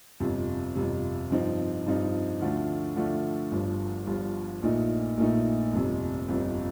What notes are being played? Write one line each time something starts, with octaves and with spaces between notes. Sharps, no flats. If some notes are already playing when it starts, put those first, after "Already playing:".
G1 F2 C3
G1 F2 C3
G2 F3 C4 D#4
G2 F3 C4 D#4
D2 D3 F3 A3
D2 D3 F3 A3
G1 G2 F3
G1 G2 F3
A#1 A#2 A3 D#4
A#1 A#2 A3 D#4
G1 F2 C3
G1 F2 C3